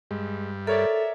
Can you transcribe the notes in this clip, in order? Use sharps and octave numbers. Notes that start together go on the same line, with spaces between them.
G2 G#3
A4 A#4 C#5 D5 E5